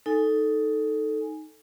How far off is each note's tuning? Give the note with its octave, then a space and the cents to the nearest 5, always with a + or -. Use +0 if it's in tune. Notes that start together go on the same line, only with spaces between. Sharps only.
D#4 +5 A4 +0 G#5 +0